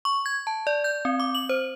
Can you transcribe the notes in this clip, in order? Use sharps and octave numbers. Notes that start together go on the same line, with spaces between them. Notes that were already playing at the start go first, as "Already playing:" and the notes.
C#6
G#6
A5
D5
G6
C4
D6
F#7
C5